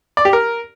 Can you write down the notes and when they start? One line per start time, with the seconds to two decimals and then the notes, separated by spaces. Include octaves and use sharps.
0.17 D5
0.25 G4
0.33 A#4